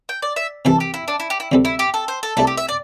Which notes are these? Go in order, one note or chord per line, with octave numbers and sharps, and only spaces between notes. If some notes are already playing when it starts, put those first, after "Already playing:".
G5
D5
E5
C2 C3 E3 A4
G4
E4
D4
E4
G4
E4
D2 C3 G3 C4 A4
E4
G4
A4
C5
A4
C2 C3 A3 D4 A4
G4
E5
D5